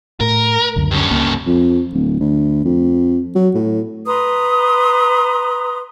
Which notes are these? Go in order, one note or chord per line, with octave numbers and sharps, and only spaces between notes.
A2 A#4
C#2 F#2 D3
G2 C#4
C#2 A#3
F2
D1
D2
F2
F#3
A2
B4 A#5 C6 D#6